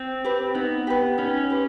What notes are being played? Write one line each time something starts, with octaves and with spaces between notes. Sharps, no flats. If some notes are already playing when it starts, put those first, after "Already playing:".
Already playing: C4
G4 B4
B3 D#4
G4 B4
C#4 D#4
G4 B4